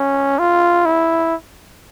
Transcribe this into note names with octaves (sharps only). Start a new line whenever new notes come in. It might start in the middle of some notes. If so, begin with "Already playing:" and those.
Already playing: C#4
F4
E4